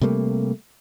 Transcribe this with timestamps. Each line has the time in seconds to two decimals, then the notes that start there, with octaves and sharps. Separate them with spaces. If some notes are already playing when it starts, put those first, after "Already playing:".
0.01 C3 G3 A3 A#3